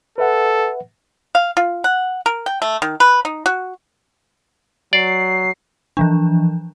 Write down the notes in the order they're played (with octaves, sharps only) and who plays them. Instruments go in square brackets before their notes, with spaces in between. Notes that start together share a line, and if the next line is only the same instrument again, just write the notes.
[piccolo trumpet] A4 [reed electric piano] B4 E5 F#5
[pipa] F5
F4
F#5
A#4
G5
A3
D#3
B4
D#4
F#4
[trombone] F#3 [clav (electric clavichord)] D5 [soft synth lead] C7
[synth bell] E3 F3 D4